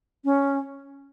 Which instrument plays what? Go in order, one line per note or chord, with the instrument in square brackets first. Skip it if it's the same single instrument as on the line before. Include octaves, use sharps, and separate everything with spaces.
[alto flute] C#4